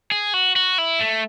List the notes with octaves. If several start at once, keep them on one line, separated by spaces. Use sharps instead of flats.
G#4
F#4
F#4
E4
A3